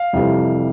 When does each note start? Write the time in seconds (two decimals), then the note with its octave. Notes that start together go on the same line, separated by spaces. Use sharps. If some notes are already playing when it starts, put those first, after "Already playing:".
Already playing: F5
0.13 F2 C3 E3 G3